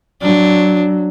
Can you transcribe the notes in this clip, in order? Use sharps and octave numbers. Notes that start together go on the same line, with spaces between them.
F#3 D4